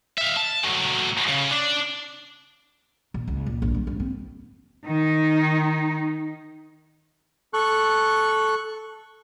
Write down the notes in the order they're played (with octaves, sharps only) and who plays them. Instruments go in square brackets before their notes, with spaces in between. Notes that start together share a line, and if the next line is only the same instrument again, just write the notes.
[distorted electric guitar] E5 F5
A5
F#3 A3
C#3
D4
[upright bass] A#2
C#2
A#2
A#1
G3
G2
C4
[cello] D#3 D#4
[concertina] A4 C#6 F#6